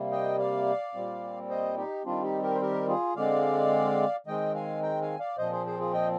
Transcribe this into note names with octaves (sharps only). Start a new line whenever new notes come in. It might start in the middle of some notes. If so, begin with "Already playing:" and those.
Already playing: C3 G3 A#3
D#5 G5
D5 F5
A#2 G3 C4
C5 D#5
D#4 G4
D#3 G3 C4 D4 F4
D#4 G4
G4 A#4
C5
G4 A#4
F4 G#4
D3 G#3 C4 D5 F5
D#3 G#3 C4 D#5 G5
F5 G#5
G5 A#5
F5 G#5
D5 F5
A#2 F3 C4 C5 D#5
G#4 C5
G#4 C5
F4 G#4
D#5 G5